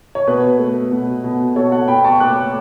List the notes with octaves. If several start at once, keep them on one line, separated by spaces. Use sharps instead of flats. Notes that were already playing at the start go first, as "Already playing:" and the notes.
C#5
B2 B4
A3
B2
B2
B2 A4 C#5
F#5 A5
B2 G5 B5
A5 C#6
A3 D6 F#6